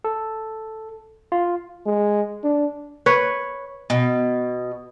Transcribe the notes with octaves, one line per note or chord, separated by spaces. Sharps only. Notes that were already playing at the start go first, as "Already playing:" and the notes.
A4
F4
G#3
D4
B4 C#5
B2